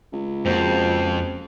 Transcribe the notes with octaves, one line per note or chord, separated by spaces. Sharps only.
C#2
F2 A#3 F#4 G#4 C5